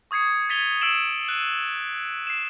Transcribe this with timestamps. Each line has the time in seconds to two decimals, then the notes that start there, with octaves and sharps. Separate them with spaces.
0.11 C#6 D#6 G#6 C7 C#7
0.49 G#6 A6 B6 D#7 F7 G7
0.81 D#6 E6 C7 D7 E7 F#7
1.29 F#6 D#7
2.27 C7 E7